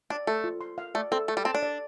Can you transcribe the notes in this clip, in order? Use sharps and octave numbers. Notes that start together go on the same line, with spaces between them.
D4 D5
A3 A4
F4
C6
F5
A3 D5
C4 A4
A3 A4
G3
C4 A5
D4
D5